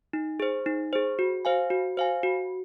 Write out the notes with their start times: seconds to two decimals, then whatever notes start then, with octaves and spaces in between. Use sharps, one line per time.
0.13 D#4
0.40 G#4 C5
0.66 D#4
0.93 G#4 C5
1.19 F#4
1.45 C5 F5 G#5
1.70 F#4
1.97 C5 F5 G#5
2.23 F#4